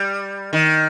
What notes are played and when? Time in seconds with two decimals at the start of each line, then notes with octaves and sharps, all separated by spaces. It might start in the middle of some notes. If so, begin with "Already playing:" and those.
Already playing: G3
0.53 D#3